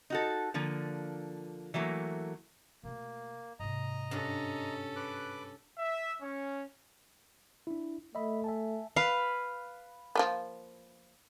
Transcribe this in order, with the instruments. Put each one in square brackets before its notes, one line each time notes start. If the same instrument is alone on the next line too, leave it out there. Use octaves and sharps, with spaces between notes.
[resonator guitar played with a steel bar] D#4 F#4 A4
D3 F3 A#3
E3 F#3 A3 A#3
[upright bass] B2 A3 [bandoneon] A#3
[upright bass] G#2 C3 [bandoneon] D#5 A#5
[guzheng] G2 F#4 [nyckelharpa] C#4 A4
[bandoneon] B4 D6 F#6
[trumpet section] E5
C#4
[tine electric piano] D4 E4
[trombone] A3 [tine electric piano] D#5 E5 B5
[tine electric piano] E5 G#5 A5
[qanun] B4 F5
[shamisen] F3 A#3 B3